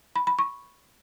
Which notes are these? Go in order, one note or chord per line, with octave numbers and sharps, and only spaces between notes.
B5
B5
C#6